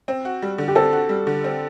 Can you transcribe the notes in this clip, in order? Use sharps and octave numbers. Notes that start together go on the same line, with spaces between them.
C4
F#4
G3
D3
G4
C4 A4
F#4
G3
D3
C4